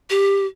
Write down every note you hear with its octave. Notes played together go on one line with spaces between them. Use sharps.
G4